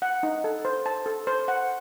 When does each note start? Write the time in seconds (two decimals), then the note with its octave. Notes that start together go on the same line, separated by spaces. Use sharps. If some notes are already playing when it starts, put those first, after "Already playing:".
0.02 F#5
0.23 D#4
0.44 A4
0.65 C5
0.86 A5
1.06 A4
1.27 C5
1.48 F#5